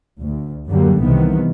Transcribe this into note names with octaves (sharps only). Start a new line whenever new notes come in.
D2
F#2 D3 F#3 G3 A#3
C2 C3 D#3 E3 B3